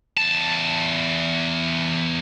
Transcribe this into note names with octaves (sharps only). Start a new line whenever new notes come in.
E2 A5